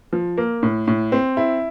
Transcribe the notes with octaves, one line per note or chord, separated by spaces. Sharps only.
F3
A#3
A2
A2
C4
E4